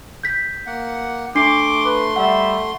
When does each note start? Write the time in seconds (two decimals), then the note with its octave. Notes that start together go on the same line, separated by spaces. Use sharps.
0.23 G6 B6
0.66 A#3 F#5
1.35 A3 D4 C6 D6 C7
1.83 B4
2.16 G3 E5 F#5